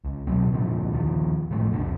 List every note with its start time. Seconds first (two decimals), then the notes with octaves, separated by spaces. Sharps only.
0.05 C#2
0.27 D#1 B2 F#3 C4
0.52 C#2 A#2 D3 F3
0.93 D#2 D#3 F3
1.51 G1 A2 F3 A3
1.73 C2 F2 D3